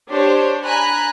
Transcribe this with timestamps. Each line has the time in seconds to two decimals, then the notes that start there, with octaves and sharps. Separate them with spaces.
0.11 D4 G4 C5 C#5
0.63 G#5 A#5 B5 F#6